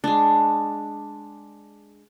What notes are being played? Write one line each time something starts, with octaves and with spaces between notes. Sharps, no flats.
G#3 D4